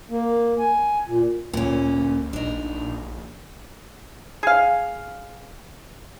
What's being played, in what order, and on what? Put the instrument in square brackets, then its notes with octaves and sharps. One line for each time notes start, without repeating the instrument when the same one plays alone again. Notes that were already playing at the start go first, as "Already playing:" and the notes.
[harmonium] A#3
G#5
A#2
[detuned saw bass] D2 [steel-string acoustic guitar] A#2 C#4
[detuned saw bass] A#1 [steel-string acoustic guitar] D4 D#4
[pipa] G#4 F5